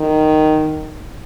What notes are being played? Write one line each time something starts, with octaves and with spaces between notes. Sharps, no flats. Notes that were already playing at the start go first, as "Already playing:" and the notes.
Already playing: D#3